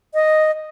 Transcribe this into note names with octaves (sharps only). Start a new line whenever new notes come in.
D#5